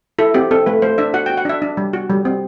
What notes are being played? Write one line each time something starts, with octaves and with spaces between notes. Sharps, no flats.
E4 A4
C4 G4
C4 A4
A3 B4
A3 C5
D4 E5
F#4 F#5
G5
F#4
F#5
D4 E5
D4
G3
F#4
G3
C4